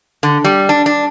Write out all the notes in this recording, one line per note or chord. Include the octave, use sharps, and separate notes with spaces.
D3
G3
D4
D4